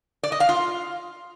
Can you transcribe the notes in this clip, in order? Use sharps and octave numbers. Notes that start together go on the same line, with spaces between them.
D5
D#5
F5
F4